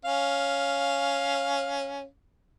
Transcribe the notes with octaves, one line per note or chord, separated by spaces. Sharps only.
C#4 F5